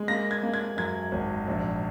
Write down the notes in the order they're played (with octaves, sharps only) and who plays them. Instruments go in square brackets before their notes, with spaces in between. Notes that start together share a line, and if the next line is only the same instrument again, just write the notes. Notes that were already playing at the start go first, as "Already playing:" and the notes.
Already playing: [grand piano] G#3
A#3 A#6
G#6
A#3
G#6
F#2 G#6
G#1
A#1